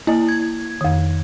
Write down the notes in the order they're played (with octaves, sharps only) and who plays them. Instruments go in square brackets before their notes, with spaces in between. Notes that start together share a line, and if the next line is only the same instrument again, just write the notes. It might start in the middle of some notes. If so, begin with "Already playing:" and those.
[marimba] A#3 D#5 [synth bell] E4
[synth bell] G#6
[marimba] F2 D#3